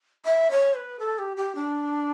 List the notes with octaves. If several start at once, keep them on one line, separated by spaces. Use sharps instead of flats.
E5
C#5
B4
A4
G4
G4
D4